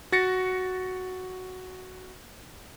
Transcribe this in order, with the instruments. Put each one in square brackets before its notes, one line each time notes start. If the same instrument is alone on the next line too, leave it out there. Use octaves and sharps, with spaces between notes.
[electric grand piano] F#4 A6 A#6 C#7